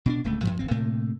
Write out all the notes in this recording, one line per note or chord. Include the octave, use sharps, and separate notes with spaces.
B2 C4 D4
D1 C#2 A3
F#2 A2 F3
D1 G#1 C4
A2 C3 A3 A#3